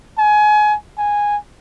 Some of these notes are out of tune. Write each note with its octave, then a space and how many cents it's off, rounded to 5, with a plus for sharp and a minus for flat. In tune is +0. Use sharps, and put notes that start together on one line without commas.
G#5 +25
G#5 -10